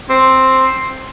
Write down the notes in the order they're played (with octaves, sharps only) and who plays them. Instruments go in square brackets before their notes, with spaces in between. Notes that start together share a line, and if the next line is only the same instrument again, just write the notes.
[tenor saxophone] C4